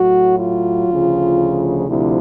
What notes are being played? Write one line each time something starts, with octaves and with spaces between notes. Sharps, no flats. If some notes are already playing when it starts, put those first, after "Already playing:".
Already playing: A2 F#3 F#4
F4
D2 C#3 F3
D2 C3 F3 E4